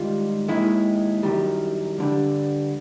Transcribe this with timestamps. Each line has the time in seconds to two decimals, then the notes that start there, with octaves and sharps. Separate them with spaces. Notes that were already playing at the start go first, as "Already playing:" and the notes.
Already playing: G#2 D#3 G3 F4
0.48 D#2 D#3 G#3 E4
1.23 F#2 D#3 G3
1.98 G2 D3 G3